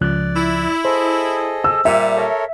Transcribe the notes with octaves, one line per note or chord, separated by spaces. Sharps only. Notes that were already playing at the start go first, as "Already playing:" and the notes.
C#2 F3 D5 F#6
E4
G#4 A4 C5 D#5
E6
A#2 G3 E5
A4 A#4 C#5